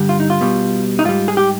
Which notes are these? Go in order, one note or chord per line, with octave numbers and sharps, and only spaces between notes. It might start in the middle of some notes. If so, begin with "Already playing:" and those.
Already playing: G2 D3 G3
F4
D#4
F4
B2 G3
D#4
G#2 G3 F4
G#4
G4